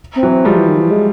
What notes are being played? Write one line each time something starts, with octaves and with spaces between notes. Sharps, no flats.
C4
E3 F#3
C4
F3 G3 G#3
E3
D#3
E3
G#3